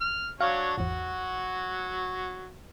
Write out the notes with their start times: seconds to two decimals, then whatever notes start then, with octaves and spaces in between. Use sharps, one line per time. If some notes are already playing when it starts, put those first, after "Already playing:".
0.01 F6
0.41 F#3 D4 C#5 F5
0.78 G#1 E2 F#3 F#4